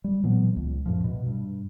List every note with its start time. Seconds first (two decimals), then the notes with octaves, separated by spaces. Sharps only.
0.04 G3
0.23 A#2 E3 F#3 B3
0.56 C#2
0.86 F#2 A2 F3
1.04 B2
1.26 G2